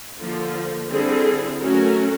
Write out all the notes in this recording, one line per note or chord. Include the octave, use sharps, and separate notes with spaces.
D3 F3 A#3
D3 G3 C4 E4 G#4
F#3 A3 C#4 F#4 A#4